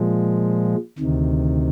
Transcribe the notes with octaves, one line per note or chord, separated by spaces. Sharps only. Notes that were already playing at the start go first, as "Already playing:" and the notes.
Already playing: A#2 F3 G#3
D2 C3 D#3